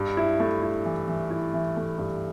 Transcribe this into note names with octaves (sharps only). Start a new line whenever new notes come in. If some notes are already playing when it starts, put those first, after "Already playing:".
Already playing: G2
E4
A3
E4
E3
E3
E4
E3
A3
G2